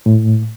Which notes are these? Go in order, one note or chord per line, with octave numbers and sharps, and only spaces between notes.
A2